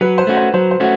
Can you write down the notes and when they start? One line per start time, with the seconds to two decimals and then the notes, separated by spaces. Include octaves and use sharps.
0.01 F#3 B4
0.18 C5
0.27 A3 C#4 F#4
0.37 C5
0.54 F#3 C5
0.71 C5
0.80 A3 C#4 F#4